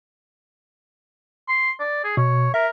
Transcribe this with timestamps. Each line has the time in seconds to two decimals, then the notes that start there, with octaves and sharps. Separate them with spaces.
1.48 C6
1.79 D5
2.04 G#4
2.17 B2 C#5
2.54 A#4 E5